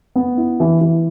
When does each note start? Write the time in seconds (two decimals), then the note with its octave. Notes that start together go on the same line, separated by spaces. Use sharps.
0.16 B3
0.37 E4
0.60 E3
0.81 E3